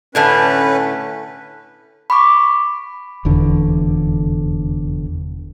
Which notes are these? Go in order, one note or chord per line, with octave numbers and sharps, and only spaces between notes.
A2 D3 A3 C#4 B4
B5 C#6 D6
F1 E2 D3